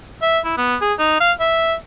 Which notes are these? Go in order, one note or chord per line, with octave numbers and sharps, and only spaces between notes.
E5
E4
B3
G#4
D#4
F5
E5